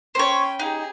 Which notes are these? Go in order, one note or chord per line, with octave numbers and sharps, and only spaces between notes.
C#4 C5 C#5 G5 B5
D#4 G4 G#4